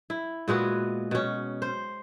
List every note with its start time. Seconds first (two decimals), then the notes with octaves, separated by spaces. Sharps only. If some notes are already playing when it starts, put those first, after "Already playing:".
0.10 E4
0.48 A#2 G#3 B3 F#4
1.11 B2 C#4
1.62 C5